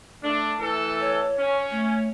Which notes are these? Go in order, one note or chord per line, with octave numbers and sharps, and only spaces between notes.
A3 D4
E3 A3 A4
C#5
C#4
A3